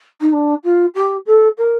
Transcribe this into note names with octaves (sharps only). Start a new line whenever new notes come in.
D#4
D4
F4
G4
A4
A#4